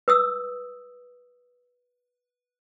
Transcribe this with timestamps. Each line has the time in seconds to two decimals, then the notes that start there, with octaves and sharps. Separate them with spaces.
0.08 B4 D#6 E6